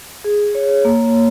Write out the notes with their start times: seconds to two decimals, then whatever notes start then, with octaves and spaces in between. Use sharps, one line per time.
0.24 G#4
0.55 C#5
0.85 A#3